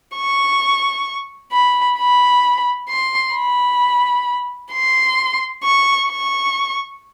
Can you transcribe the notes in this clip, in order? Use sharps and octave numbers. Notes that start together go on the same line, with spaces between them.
C#6
B5
B5
C6
B5
C6
C#6
C#6